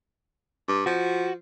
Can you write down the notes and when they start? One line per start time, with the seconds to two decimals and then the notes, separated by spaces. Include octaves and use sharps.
0.68 G2
0.86 F3 F#4